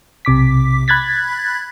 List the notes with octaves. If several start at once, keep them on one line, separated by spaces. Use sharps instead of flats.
B1 C3 D6 B6
B5 F#6 G#6 A6 B6